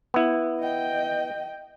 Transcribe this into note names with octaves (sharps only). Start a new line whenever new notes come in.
B3 E4
D#5 G5